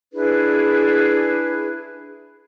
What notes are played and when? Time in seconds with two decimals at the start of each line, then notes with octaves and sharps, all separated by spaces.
0.12 D4 E4 G#4 B4